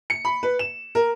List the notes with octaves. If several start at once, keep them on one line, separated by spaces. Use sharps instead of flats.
C#7
B5
B4
E7
A#4